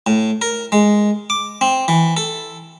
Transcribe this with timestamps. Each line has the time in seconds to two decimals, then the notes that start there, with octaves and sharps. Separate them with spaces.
0.07 A2
0.42 A#4
0.72 G#3
1.30 D6
1.61 C4
1.88 E3
2.17 A4